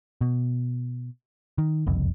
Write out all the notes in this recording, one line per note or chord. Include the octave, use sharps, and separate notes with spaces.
B2
D#3
F#1 C2 F2